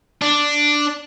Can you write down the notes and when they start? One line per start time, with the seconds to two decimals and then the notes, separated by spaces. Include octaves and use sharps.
0.22 D4